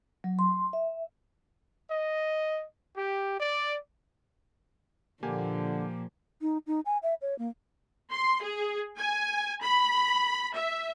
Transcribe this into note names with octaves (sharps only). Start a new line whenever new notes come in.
F#3
C6
E5
D#5
G4
D5
A#2 D3 F3 A#3 G4 G#5
D#4
D#4
G#5
E5
C#5
A#3
C6
G#4
G#5
B5
E5